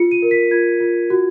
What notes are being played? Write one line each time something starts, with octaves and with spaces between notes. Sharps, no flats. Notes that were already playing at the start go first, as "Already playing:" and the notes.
Already playing: F4 C#7
D#7
A#4
B6
F4 G#6
F4
F#4